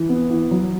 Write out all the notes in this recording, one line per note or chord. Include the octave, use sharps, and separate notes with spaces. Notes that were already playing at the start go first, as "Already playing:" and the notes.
Already playing: E3
B3
E3
F#3